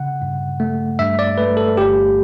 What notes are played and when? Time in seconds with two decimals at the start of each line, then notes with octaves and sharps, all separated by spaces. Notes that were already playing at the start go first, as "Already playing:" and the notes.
Already playing: C#3 F#5
0.22 G2
0.60 A3
0.99 G2 E5
1.19 D5
1.38 A3 B4
1.57 A4
1.77 G1 G4